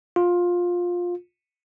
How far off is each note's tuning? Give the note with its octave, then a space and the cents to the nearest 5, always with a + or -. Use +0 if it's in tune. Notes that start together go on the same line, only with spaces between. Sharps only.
F4 +15